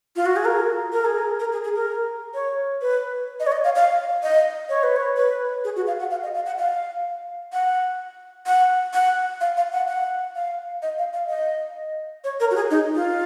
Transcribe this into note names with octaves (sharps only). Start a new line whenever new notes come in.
F4
F#4
G#4
A#4
A#4
G#4
A#4
A#4
G#4
G#4
A#4
C#5
B4
D#5
C#5
D#5
F5
F5
D#5
C#5
B4
C#5
B4
G#4
F#4
F5
F#5
F5
D#5
F5
F#5
F5
F#5
F#5
F#5
F5
F5
F#5
F#5
F5
D#5
F5
F5
D#5
C#5
A#4
F#4
G#4
D#4
F4